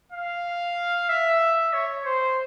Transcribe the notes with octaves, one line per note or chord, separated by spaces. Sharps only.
F5
E5
C#5
C5